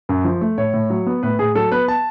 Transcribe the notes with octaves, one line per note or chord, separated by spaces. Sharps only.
F#2
F3
A3
A2 C#5
A2
F#3
B3
A2 B4
A2 G#4
F#3 A4
B3 B4
A5